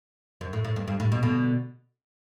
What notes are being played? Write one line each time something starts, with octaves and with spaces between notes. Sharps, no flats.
F#2
A2
A2
G2
G2
A2
B2
B2 D3